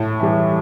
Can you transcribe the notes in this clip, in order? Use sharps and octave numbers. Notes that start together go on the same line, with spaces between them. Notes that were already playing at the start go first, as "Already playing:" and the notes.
Already playing: A2
E3 G3